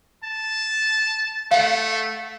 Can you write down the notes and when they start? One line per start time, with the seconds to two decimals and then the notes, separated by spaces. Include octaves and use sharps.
0.24 A5
1.51 A3 F5 F#5